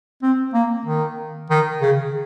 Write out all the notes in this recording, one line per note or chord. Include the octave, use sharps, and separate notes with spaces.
C4
A#3
D#3
D#3
C#3